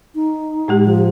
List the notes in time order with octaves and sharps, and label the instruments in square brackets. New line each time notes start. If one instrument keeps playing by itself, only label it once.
[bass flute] D#4
[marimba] A2 G#3 G4
[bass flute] F3